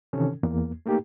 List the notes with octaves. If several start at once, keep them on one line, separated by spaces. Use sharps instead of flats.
C3 D#3 E3 C#4 A4
E2 A#3
A3 A#3 D#4 G4